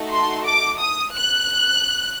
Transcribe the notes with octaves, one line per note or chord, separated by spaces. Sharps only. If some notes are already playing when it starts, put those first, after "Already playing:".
Already playing: A3 D#4 F#4 A4
C6
D6
D#6
F#6